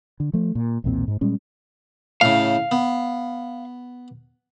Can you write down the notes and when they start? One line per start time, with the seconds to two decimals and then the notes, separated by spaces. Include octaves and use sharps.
0.20 D3
0.33 F3 A3
0.55 A#2
0.84 B1 E2 A#2 C4
1.08 G#2
1.21 A#2 G3 G#3 C#4
2.21 A2 C#3 F5
2.71 B3